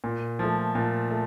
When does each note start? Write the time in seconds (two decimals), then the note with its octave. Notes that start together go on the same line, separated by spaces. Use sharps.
0.04 A#2
0.39 F3 A3
0.75 A#2
1.11 A3